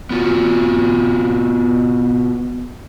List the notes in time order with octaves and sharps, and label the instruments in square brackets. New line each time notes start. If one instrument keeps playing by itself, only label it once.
[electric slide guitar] B3 F4 F#4